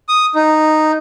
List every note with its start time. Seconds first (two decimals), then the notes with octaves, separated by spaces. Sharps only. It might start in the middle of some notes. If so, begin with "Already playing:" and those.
0.09 D#6
0.35 D#4